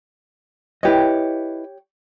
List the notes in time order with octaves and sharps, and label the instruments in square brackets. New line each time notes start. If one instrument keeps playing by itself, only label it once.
[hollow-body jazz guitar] E4 B4 D#5 [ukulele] G4 C#5